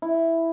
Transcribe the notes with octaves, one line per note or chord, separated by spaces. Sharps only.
E4